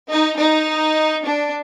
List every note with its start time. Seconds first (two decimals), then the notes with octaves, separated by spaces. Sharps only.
0.09 D#4
0.37 D#4
1.23 D4